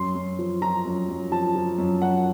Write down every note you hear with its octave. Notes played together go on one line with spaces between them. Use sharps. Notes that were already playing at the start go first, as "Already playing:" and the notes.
Already playing: F#2 C6
F#2
F3
F3 A#5
F#2
F#2
F3 A5
F3
F#2
F#2 F#5